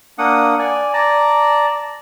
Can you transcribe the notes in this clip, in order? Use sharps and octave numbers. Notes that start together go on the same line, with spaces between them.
A#3 D4 F#5 D#6
D5 G#5
D5 A5 A#5